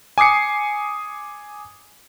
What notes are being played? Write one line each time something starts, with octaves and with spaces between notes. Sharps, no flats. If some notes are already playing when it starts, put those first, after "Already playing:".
G#5 D6 D#6 C7 C#7